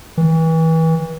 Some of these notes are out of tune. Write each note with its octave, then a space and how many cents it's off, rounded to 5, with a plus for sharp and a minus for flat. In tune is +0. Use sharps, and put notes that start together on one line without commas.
E3 -30